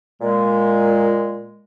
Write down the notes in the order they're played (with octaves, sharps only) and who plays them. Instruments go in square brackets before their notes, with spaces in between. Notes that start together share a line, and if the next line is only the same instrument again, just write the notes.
[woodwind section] A#2 G#3